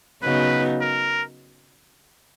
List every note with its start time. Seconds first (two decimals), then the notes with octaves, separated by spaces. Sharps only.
0.23 C#3 F#3 B3 D#4 B4
0.81 A#4